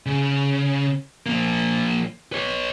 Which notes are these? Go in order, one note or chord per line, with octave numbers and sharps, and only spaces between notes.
C#3
F3 A#3
B4 C#5